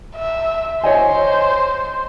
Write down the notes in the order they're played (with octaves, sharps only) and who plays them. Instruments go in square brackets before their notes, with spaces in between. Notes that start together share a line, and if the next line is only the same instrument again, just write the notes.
[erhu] E5
[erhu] C5 [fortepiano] C#5 D#5 G#5